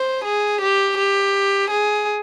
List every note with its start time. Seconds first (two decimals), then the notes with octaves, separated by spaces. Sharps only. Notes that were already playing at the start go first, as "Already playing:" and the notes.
Already playing: C5
0.25 G#4
0.61 G4
0.98 G4
1.71 G#4